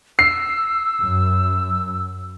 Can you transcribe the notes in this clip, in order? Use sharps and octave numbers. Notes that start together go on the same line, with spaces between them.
E6 C7
F#2